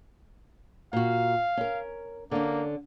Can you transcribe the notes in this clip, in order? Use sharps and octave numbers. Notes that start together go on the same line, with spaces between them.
A#2 F#4 F5
C#4 A#4
D3 A#3 C#4